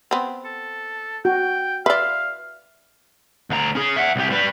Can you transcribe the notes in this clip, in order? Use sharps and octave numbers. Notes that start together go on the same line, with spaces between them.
B3 C4
A4
F#4 G5
B4 D5 E5 F5 C6
D2 A#5
C#4 G#4
E5 F#5
C2 G4
G3 B4